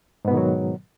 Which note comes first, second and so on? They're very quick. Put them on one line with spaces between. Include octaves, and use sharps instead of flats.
G#2 B3 B2 D#3 F#3